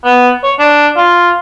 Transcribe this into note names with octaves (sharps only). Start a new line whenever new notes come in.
B3
C#5
D4
F4